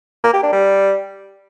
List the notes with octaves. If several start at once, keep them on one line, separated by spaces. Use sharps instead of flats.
A#3
G4
D4
G3